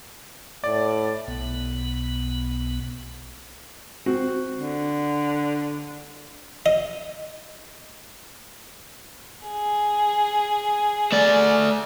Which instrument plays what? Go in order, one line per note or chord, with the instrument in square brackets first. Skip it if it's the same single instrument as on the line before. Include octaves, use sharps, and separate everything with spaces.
[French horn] A2 [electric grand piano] D5
[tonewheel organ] B1 B2 B3
[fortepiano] C4 F#4
[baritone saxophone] D3
[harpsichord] D#5
[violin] G#4
[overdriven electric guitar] A3 D5